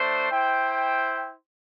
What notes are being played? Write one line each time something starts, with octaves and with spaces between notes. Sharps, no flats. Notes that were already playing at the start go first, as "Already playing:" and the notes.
Already playing: A3 D4 C5
E4 C5 G5